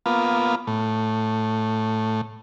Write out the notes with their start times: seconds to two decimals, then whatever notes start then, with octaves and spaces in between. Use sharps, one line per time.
0.06 A#3 B3 F4
0.67 A2